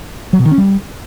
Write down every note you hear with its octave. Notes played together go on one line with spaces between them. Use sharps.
F#3
B2
D#3
C#4
G3